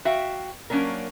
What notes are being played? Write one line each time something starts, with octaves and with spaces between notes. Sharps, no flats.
F#4 E5 F5 G5
F#3 A#3 C#4 D4 A#4